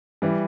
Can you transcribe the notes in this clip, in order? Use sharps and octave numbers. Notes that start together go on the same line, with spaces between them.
E3 G3